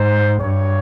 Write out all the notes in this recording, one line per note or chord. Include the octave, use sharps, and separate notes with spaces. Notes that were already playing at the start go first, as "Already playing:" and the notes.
Already playing: G#2 C5
G2 C#5